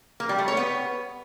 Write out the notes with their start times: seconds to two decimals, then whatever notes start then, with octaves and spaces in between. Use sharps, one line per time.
0.20 A#3
0.29 G3
0.38 A3
0.48 C#5
0.57 B3